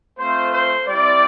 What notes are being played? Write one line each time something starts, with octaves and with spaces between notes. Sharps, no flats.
A3 C4 F4 C5
C5
G3 C4 E4 D5